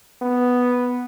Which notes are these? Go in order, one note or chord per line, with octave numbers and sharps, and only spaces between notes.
B3